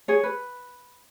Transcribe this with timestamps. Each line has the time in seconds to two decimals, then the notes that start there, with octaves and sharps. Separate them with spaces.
0.08 G#4 C#5
0.24 B4